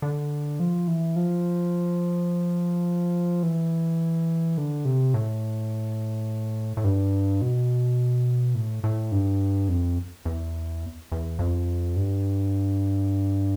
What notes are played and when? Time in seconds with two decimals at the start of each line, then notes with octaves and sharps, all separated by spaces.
0.02 D3
0.59 F3
0.88 E3
1.16 F3
3.43 E3
4.58 D3
4.85 C3
5.14 A2
6.77 A2
6.84 G2
7.42 B2
8.55 A2
8.84 A2
9.12 G2
9.69 F2
10.25 E2
11.12 E2
11.39 F2
11.96 G2